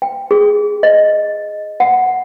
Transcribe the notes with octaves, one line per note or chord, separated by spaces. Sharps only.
G5
G#4
D#5
F#5